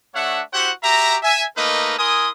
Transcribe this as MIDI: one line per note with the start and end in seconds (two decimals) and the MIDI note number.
0.14 0.41 57
0.14 0.41 62
0.14 0.41 73
0.14 0.41 76
0.14 0.41 78
0.53 0.71 64
0.53 0.71 66
0.53 0.71 67
0.53 0.71 72
0.53 0.71 78
0.83 1.16 66
0.83 1.16 67
0.83 1.16 76
0.83 1.16 82
1.23 1.44 76
1.23 1.44 80
1.57 1.97 57
1.57 1.97 58
1.57 1.97 63
1.57 1.97 70
1.57 1.97 71
1.57 1.97 75
1.98 2.29 64
1.98 2.29 70
1.98 2.29 80
1.98 2.29 84
1.98 2.29 87